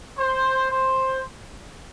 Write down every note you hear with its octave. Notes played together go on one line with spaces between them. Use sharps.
C5
C5